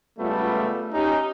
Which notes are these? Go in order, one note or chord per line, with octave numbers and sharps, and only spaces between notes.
C#2 F#2 G3 A3 B3 F4
C#4 D#4 G4